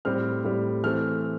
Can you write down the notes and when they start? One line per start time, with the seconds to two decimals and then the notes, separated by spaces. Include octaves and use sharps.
0.05 A2 G3 C4 F6
0.45 A2 G3 C4
0.84 E3 A3 C4 F6